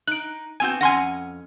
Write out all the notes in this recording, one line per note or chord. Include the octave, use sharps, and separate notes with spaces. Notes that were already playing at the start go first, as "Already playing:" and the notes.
D#4 F#6 D7
B3 C4 F#4 G#5 G6
F2 C#4 F#5 G#5 C6 A#6